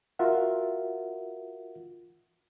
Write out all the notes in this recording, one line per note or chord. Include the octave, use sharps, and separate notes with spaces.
F4 F#4 A#4 E5 F#5